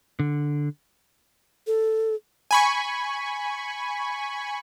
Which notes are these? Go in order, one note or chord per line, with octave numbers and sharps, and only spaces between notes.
D3
A4
G#5 B5 C#6